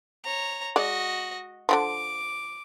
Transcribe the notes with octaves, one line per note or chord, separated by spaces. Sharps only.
C#5 A#5
G#3 F#4 D5 D#5
D3 E3 F3 D6